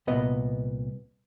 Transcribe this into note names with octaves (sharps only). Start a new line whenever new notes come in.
C2 A#2 B3 D#5